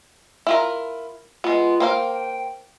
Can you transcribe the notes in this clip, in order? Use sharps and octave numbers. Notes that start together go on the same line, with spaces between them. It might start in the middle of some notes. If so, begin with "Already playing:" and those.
E4 F4 A#4
G#3 B3 F4
A#3 C5 F5 G5